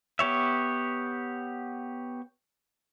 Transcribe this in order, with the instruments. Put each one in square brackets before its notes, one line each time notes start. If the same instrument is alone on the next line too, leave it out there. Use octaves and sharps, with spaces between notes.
[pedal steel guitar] B3 G4 C#5 E5